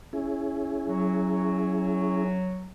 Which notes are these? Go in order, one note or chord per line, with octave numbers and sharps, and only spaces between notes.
C#4 E4 G#4
F#3